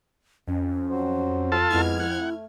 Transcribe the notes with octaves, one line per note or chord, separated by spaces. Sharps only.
F2 C#4
F#3 F#4 C5
F4 A4 A5
F2 G#3 B3 E4 F6 G#6
E4 F#5
A3